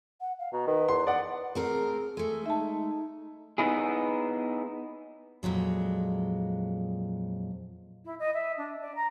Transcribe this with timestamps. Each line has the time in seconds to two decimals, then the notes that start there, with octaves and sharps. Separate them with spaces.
0.21 F#5
0.39 F5
0.53 B2 A#5
0.67 D#3 B4
0.88 E2 C6
1.07 B3 D5 F#5
1.55 A3 C4 G#4 A#4
2.17 G#3 A3 A4
2.46 D#4 E5 A5
3.58 B3 D#4 E4 G#4
5.43 F2 A#2 F#3 G#3
8.05 E4
8.19 D#5
8.34 E5
8.57 D4
8.81 D5
8.96 A#5